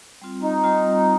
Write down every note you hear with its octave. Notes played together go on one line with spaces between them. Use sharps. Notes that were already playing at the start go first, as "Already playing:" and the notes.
G3 C4 F4
D#4
G3 C4 F4